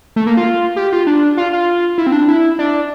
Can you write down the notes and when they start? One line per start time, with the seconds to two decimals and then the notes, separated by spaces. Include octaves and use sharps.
0.16 A3
0.27 A#3
0.37 F4
0.76 G4
0.92 F4
1.07 D4
1.37 F4
1.53 F4
1.98 E4
2.07 C4
2.12 D4
2.28 E4
2.59 D4